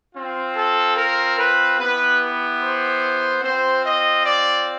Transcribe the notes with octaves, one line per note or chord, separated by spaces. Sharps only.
C4 F4
A4
A#4
B4
B3 E4 G4 B4
C5
C4 F4 C5
D#5
D5